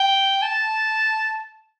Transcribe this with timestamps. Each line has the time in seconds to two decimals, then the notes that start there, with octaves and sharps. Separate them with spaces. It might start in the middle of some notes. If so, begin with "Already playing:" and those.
Already playing: G5
0.42 A5